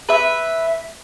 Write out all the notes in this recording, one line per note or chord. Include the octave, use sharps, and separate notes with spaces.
B4 E5